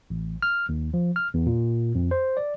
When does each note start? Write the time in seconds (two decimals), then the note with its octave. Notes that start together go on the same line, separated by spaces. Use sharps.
0.10 A1
0.42 F6
0.69 D#2
0.94 F3
1.16 F6
1.34 E2
1.46 A#2
1.95 F2
2.11 C5
2.37 D5